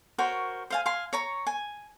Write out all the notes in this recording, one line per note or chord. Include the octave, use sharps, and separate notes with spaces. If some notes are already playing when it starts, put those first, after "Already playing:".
F#4 A#4 C5 C#5
C5 F5 G#5
F5 G#5 C6
C#5 A#5 C#6
G#5